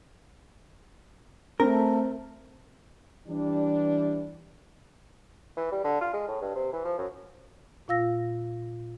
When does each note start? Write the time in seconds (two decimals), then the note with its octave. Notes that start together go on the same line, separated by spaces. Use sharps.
1.60 A3 C4 A#4
3.28 E3 G3 D4
5.57 E3
5.72 G3
5.84 D3
6.01 F4
6.13 G#3
6.28 A2
6.41 G2
6.55 C3
6.73 E3
6.84 F3
6.98 F#2
7.88 A#2 F4 F5 E6 A#6